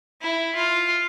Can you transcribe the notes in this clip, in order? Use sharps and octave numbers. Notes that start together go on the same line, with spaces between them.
E4
F4